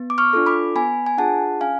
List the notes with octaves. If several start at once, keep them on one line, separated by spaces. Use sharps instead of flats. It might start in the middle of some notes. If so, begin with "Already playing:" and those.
Already playing: B3
D6
C#6 F6
D4 F4 A4
B5 D6
B3 G#5 B5
G#5
D4 F4 G#4 F#5 A5
C#4 F5 G#5